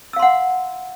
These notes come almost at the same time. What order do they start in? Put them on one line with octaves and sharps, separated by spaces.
E6 F5 C6 F#5